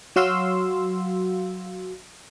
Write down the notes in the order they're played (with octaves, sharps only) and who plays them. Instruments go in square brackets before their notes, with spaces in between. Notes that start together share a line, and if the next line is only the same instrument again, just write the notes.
[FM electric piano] F#3 F#4 F5 C6 E6